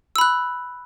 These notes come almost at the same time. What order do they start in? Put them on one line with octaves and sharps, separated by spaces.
E6 B5 F#6